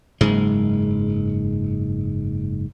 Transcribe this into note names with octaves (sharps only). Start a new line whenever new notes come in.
F#1 G#2 G#3